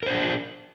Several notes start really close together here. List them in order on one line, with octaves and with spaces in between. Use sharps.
A#4 C5 D4 G#4